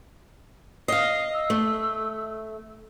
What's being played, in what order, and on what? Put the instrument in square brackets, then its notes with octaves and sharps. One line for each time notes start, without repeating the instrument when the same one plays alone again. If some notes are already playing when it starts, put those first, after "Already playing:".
[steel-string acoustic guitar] D#5 F5 [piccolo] C7
[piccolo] E6
[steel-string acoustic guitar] A3